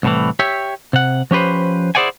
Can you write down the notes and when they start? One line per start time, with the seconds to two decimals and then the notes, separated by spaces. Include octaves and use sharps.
0.03 C2 A2 E3
0.39 G4 C#5 E5
0.93 C3 F#5
1.31 F3 C#4 G4 B4 C5
1.95 E4 G#4 C5 D5 F#5 G#5